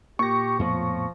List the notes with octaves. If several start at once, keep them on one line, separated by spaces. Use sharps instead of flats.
A#2 G4 C#6 A#6
F2 A2 F3 B3